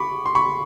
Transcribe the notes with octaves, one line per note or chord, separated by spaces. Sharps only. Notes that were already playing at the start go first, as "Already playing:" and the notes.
Already playing: B5 C#6 D6
C6
B5 C#6